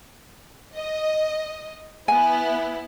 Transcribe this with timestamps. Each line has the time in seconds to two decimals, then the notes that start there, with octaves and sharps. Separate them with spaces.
0.76 D#5
2.08 B3 E4 G#5